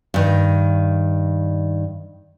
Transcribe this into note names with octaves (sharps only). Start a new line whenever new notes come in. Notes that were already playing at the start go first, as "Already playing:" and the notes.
G2 D#3